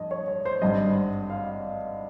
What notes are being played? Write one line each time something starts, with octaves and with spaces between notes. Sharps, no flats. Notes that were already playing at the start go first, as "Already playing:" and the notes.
Already playing: G2 F3 D#5
C#5
C#5
C5
G#1 G2 G3 D#5
F5